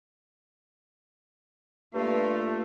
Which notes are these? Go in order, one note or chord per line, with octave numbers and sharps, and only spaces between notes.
G2 A3 A#3 F4